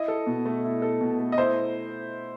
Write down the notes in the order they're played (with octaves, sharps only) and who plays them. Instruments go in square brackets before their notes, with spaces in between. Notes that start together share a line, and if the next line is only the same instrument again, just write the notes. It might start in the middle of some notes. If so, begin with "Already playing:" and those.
Already playing: [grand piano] E4 [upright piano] D#5
[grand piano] A4
B2
A3
E4
A4
B2
A3
[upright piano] D#5
[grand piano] E4 [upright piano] C5